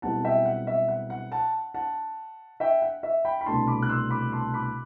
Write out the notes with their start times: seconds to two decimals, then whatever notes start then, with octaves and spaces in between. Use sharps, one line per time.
0.02 B1 B2 G3 C4 E4 F#5 A5
0.24 E5 G5
0.46 F#5
0.67 E5
0.88 F#5
1.10 F#5
1.31 F#5 A5
1.74 F#5 A5
2.60 E5 G5
2.82 F#5
3.03 E5
3.25 G5 B5
3.41 B5
3.46 C2 B2 A3 D4 A5 C6
3.67 B5 D6
3.83 F#6
3.89 C6 E6
4.10 B5 D6
4.32 A5 C6
4.54 B5 D6